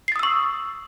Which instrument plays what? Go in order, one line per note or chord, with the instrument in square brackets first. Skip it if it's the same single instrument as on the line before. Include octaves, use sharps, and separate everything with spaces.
[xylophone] C7
A6
D#6
E6
C#6